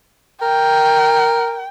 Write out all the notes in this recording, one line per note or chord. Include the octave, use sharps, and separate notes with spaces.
A#4 G5